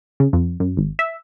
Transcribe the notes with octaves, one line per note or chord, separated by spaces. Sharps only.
C#3
F2
F#2
G#1
E5